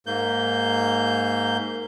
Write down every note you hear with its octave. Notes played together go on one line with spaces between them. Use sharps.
G#2 A#3 G6